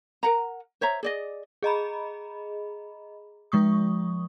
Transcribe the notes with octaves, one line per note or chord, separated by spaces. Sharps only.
A#4 F#5 A#5
C5 C#5 E5 A#5
G#4 D5 D#5
G#4 D#5 A#5 B5
F3 G#3 C#6 D#6